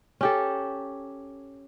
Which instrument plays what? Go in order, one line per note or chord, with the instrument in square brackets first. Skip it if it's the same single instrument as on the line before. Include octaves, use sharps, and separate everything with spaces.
[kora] C#4 G4 A4